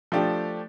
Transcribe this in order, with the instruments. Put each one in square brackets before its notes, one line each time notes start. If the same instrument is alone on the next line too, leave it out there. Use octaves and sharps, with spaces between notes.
[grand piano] F3 A3 D4 G4